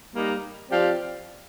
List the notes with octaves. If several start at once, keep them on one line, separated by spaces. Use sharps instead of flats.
G3 A#3 D#4
F3 C4 G4 D5 F5